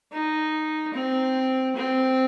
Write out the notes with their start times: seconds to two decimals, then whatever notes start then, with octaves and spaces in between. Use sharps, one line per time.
0.12 D#4
0.94 C4
1.76 C4